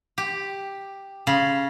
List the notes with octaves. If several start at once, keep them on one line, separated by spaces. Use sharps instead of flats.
G4
C#3